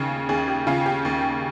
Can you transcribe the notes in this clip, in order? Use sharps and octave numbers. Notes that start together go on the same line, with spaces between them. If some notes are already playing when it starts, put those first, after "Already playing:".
Already playing: D#2 C#3
D#2 G#4
G4
C#3 F4
G4
D#2